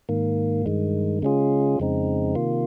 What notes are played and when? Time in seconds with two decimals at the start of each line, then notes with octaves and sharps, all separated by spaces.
0.09 G#2 D#3 A#3
0.66 G2 D#3 G#3
1.22 C#3 G#3 C#4 F4 G#4
1.80 F2 C#3 G#3 C4 D#4
2.35 C3 D#3 A#3 F4